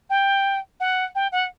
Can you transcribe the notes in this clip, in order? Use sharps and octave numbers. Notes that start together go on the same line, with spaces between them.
G5
F#5
G5
F#5